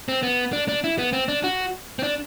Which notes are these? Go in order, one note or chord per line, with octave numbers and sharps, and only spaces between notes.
C4
B3
D4
D4
E4
B3
C4
D4
F#4
C4
D4